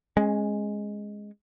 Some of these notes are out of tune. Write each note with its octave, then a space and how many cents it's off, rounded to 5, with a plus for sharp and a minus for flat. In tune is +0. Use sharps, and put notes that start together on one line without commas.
G#3 +0 C#4 -25